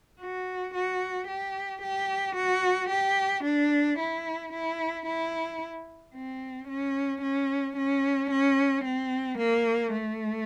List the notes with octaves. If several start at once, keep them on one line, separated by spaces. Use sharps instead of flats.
F#4
F#4
G4
G4
F#4
G4
D4
E4
E4
E4
C4
C#4
C#4
C#4
C#4
C4
A#3
A3